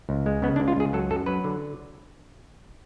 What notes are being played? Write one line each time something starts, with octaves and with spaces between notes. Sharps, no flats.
C#2
G#3
C#3 B3
D4
C#2
F4
C#2 G#4
F#3 A4
F#2 A4
F#3 B4
D3